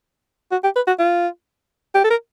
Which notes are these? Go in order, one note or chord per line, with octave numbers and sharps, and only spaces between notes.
F#4
G4
B4
F#4
F4
G4
A4
A#4